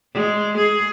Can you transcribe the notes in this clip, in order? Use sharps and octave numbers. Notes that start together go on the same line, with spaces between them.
G#3
G#4